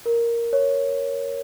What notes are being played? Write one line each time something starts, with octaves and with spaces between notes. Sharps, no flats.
A#4
C#5